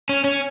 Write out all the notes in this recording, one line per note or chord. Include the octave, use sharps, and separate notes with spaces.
C#4
C#4